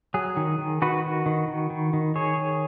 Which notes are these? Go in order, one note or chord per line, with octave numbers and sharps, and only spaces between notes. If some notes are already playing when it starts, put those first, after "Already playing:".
F#3 G#4
D#3
D#3
D#3 F#4 B4
D#3
D#3
D#3
D#3
D#3
D#3 G#4 C#5
D#3